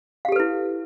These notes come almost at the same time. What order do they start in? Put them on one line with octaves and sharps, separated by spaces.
F5 G4 A4 B4 E4